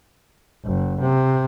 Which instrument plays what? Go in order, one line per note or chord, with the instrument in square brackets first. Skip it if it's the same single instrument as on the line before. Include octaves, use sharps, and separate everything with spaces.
[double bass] F#1
C3